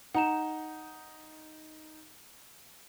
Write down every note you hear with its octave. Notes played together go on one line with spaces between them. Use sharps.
D#4 F#5 A#5 E7